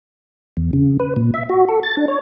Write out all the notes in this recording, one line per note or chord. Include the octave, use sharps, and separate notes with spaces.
E2
C#3
B4
A#2
E5
F#4
A4
A6
D4
C#5